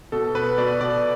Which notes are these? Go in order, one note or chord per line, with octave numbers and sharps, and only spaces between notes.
B2 A4
B3 B4
B2 D5
B2 D5